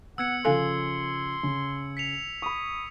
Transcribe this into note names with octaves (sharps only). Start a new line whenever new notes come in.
B3 F#5 E6 G#6 C#7
C#3 F3 A4 F5 G#5 C6
C#3
B6 C#7 F7
B5 C#6 D#6